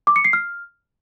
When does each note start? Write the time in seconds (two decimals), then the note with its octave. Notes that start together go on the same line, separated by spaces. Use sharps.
0.07 D6
0.16 C#7
0.25 C7
0.33 F6